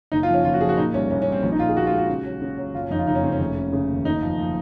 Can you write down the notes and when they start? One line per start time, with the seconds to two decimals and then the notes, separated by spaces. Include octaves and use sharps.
0.12 F#1 D#4
0.23 F4
0.28 F3
0.34 C#4
0.45 F#1 F4
0.54 F#4
0.61 F3 G#4
0.69 F#4
0.77 A#2 D#4
0.94 C2 C#4
1.10 C2 C#4
1.22 C#4
1.27 C2
1.32 C4
1.43 A#1 C#4
1.52 D#4
1.59 A#2 F4
1.68 G#4
1.76 A#1 F#4
1.87 F4
1.92 G#3
1.98 F#4
2.09 C#3
2.25 F#3
2.42 C#3
2.58 F#3
2.74 F#1 F4
2.83 C#4
2.90 F2 D#4
2.99 F4
3.07 F#1 D#4
3.15 C#4
3.24 C#3 C4
3.32 C#4
3.40 F1
3.56 C#3
3.73 C#3
3.90 D#2
4.05 F#1 D#4
4.22 F3
4.39 F3